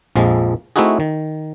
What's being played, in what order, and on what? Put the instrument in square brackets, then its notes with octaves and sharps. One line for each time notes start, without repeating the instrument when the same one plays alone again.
[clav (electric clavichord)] A#1 F2 F3 G#3
A3 C4 D#4 E4 F#4 G#4
D#3